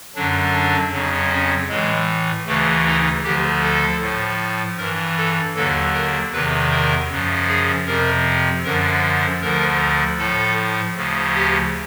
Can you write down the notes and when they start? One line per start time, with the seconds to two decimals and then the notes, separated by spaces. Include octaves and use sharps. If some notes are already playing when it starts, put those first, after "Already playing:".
0.15 F#2 D3 F#3 D4
0.54 D4
0.92 F2 C#3 F#3
1.31 C#4
1.69 A2 E3 G#3
2.46 D2 C#3 E3 A3
2.85 D#4
3.24 D2 D3 F3 G4
3.63 A4
4.01 A2 F3
4.78 G2 E3 A#4
5.17 A4
5.55 D#2 D3 F#3 A4
5.94 A#4
6.33 E2 C3 D#3 B4
6.71 A#4
7.10 F#2 C#3 F3
7.48 G#4
7.87 F2 C3 F3 A#4
8.64 F#2 D3 F3 A#4
9.42 D2 D3 F3 A#4
10.18 A2 F3 A4
10.96 D2 C#3 F3
11.35 G4